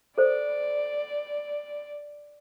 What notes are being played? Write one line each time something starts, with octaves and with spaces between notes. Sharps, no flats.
A4 C5 D5